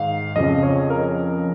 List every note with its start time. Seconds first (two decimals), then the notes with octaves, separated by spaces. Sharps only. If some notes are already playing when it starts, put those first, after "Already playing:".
Already playing: G#2 D#3 F5
0.36 F2 C#3 F3 D#5
0.63 C#5
0.90 A#4